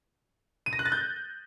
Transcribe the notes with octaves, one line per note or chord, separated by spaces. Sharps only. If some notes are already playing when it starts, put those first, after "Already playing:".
D#7
A#6
F#6
A6
G6